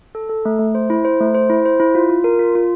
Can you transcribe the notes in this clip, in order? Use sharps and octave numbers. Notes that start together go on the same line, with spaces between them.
A4
A4
A3
A3
C5
E4
C5
A3
C5
E4
C5
E4
F4
F4
A#4
F4
F4